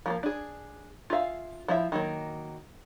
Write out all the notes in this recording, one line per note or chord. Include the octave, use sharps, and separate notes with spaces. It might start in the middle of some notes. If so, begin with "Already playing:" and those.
F3 A3 A#3
D4 G#4
F4 G#4 E5 F5
F3 E4 E5
D#3 F#3 A#3